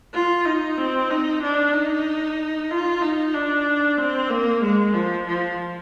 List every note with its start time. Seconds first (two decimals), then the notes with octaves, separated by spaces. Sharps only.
0.13 F4
0.45 D#4
0.78 C4
1.10 D#4
1.42 D4
1.73 D#4
2.70 F4
3.02 D#4
3.34 D4
3.97 C4
4.30 A#3
4.62 G#3
4.94 F3
5.26 F3